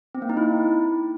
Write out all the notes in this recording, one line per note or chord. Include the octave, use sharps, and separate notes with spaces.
C4
A#3
D#4
E4